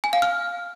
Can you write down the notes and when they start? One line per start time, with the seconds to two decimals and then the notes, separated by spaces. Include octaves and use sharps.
0.04 G#5
0.13 F5
0.22 F6